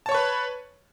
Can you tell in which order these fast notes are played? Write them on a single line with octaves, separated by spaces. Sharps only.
A5 C#5 C#6 B4